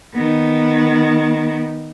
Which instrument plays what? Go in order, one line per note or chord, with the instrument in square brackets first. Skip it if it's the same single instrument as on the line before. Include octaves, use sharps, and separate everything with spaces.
[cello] D#3 B3